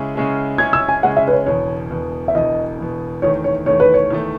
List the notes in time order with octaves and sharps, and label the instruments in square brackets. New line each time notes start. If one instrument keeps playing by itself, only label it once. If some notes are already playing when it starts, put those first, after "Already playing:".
Already playing: [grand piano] C#3 G#3 C#4 E4 G#4
C#3 G#3 C#4 E4 G#4
[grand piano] C#3 G#3 C#4 E4 G#4 [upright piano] G#6
[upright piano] E6
G#5
[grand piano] C#3 G#3 C#4 E4 G#4 [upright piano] F#5
[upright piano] E5
B4
C#5
[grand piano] E1 E2 B2 [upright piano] C#5
[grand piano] E1 E2 B2
[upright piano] E5
[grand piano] E1 E2 B2 [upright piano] D#5
[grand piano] E1 E2 B2
[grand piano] E2 D#3 A3 [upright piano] C#5
[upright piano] C#5
[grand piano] E2 D#3 A3 [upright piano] C#5
[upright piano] B4
C#5
[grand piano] E2 D#3 A3